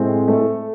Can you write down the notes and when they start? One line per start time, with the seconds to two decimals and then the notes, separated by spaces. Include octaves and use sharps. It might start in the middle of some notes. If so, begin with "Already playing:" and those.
Already playing: A2 G#3 C4
0.28 A3 A4